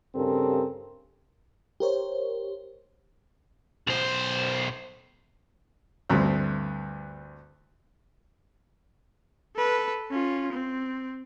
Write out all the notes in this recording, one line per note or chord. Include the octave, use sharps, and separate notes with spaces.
G2 C#3 C4 G4 A4 A#4
G4 A#4 C5 C#5
B1 C5
D2 G2 A3 C4
A4 B4
C#4 F4
C4